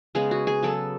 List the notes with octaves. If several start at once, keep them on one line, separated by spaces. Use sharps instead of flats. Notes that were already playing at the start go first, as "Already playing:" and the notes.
C#3 G#3 B3 G#4
F#4
G#4
C#3 F#3 B3 A4